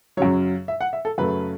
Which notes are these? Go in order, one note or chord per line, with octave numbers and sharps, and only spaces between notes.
F#2 C#3 F#3 C#5
E5
F#5
E5
A4
F#2 C#3 F#3 A3 B4